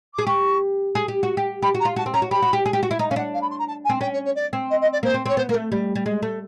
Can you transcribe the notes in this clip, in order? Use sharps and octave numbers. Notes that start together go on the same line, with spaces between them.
G#4 D6
G4 C#6
G#4
G4
F#4
G4
G4 B5
F#4
A#5
F4
F#4 A5
C4
C#4 A#5
F#4
G4 B5
F#4
G4
G#4
G4
F#4
E4
D#4 A#5
C#4 F5
D4 F#5
F5
B5
C6
A#5
A5
G#5
C4
C#4 G5
C#5
C#5
D5
C4
D#5
D#5
D5
A#3 C5
C4
C4 C#5
B3 C5
A#3 A#4
A3
G3
G3
G#3
A3